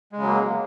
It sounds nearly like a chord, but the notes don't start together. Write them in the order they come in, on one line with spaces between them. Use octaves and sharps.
G#3 C#3 F#3 A#3